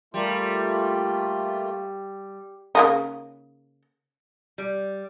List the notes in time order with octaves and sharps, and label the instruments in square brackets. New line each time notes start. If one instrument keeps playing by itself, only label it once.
[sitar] G3 [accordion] A3 A#3 F4
[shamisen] C#3 A#3 D#4
[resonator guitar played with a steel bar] G3